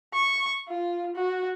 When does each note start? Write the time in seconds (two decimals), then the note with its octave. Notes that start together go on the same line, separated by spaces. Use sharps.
0.14 C#6
0.69 F4
1.15 F#4